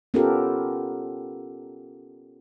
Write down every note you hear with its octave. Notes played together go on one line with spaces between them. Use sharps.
B3 C#4 F4 G4 A4 A#4